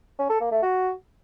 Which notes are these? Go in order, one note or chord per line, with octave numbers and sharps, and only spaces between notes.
C#4
A4
A#3
A3
F#4